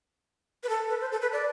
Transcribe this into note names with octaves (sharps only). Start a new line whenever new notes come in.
B4
A4
B4
C5
A4
B4
D5